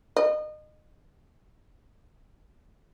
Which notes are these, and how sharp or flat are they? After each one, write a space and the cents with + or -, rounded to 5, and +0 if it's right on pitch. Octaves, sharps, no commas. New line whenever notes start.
D#5 -30